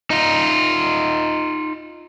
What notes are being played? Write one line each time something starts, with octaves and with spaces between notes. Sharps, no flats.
D#4 F4